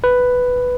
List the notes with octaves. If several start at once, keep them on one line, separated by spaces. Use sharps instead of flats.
B4